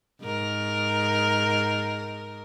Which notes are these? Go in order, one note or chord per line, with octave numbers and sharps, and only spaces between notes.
G#2 A#4